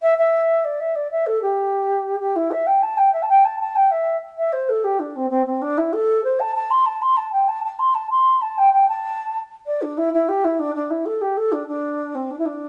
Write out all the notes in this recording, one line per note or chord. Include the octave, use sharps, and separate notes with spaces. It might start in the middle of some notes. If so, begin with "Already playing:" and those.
E5
E5
D5
E5
D5
E5
A4
G4
G4
E4
E5
G5
A5
G5
E5
A5
G5
A5
A5
G5
E5
E5
C5
A4
G4
D4
C4
C4
C4
D4
E4
A4
C5
A5
A5
C6
A5
C6
A5
G5
A5
A5
C6
A5
C6
A5
G5
G5
A5
D5
D4
E4
E4
G4
E4
D4
D4
E4
A4
G4
A4
D4
D4
C4
D4
E4
D4